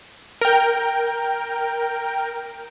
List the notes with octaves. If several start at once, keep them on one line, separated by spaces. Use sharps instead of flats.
A#4 G5